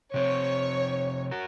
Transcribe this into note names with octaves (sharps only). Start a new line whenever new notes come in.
C3 F3 C4 C#5
F#4 A#4